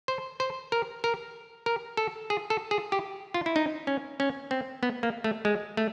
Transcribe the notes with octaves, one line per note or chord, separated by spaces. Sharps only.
C5
C5
A#4
A#4
A#4
A4
G#4
A4
G#4
G4
F4
E4
D#4
C#4
C#4
C4
B3
A#3
A3
G#3
A3